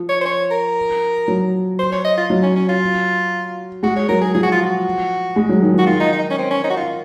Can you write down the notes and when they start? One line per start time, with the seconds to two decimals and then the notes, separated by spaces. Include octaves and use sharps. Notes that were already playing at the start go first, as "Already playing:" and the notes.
Already playing: F3
0.09 C#5
0.21 C5
0.26 C#5
0.51 A#4
1.28 F#3
1.79 C5
1.92 C#5
2.04 D#5
2.18 F4
2.30 F#3
2.43 C#4
2.55 C#4
2.69 F4
3.83 G#3 F#4
3.96 C#5
4.09 F#3 A#4
4.21 G#4
4.34 F3 G#4
4.43 F#4
4.52 F4
4.62 F#4
5.36 G#3
5.49 F#3
5.62 D#3
5.74 F3 F#4
5.87 D#3 F4
6.00 D#4
6.13 D#4
6.30 C#4
6.38 C4
6.51 C#4
6.64 D#4
6.70 F#4
6.77 F4